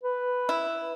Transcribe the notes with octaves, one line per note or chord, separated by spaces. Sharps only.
B4
E4